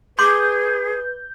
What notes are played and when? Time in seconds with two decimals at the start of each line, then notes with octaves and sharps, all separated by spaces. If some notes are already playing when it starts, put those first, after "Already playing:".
0.19 G#4 B4 C6 D6 G6